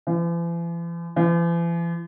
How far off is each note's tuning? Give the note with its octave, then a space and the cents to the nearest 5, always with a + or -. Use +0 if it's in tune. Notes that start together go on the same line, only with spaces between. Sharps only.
E3 +45
E3 +45